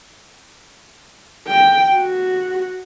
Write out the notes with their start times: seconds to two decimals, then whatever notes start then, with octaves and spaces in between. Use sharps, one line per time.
1.48 G5
1.94 F#4